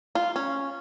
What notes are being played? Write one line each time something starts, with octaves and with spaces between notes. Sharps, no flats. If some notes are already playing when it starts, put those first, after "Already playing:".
F4
C#4